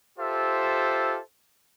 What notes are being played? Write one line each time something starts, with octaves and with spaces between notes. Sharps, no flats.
F4 G4 A4 C5 E5